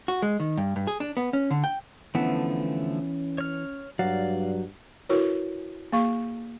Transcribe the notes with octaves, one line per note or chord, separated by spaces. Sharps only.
F#4
G#3
D#3
G2
G2
G#4
D4
B3
C#4
D3
G5
D3 E3 F3 A3 B3 C#4
C#5 F6
G2 F#3 D5 F5
E4 F#4 A#4 B4 C#5
A#3 G#4 F5 C#6